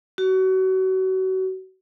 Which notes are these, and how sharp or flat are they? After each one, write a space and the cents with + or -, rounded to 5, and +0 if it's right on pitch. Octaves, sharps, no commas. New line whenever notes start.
F#4 +30